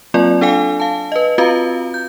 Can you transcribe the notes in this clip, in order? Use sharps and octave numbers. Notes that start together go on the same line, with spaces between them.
F#3 A#3 C4 F4 D5
D4 A4 F5 G#5
F5 A5
B4 D#5
C4 F4 F#4 B4 F5 A#5
G6